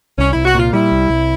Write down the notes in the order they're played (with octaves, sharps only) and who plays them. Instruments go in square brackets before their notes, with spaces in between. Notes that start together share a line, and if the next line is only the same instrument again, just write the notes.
[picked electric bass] C2 [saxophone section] C#4
[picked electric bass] C2 [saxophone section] E4
[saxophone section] F#4
[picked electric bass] A#2 [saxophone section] F4
[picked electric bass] G3 [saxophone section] E4
[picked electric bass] C2
C2